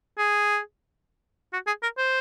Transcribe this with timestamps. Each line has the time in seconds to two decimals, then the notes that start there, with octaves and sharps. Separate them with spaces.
0.18 G#4
1.53 F#4
1.67 G#4
1.83 A#4
1.98 C5